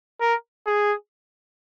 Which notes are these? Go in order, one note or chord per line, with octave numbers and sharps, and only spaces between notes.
A#4
G#4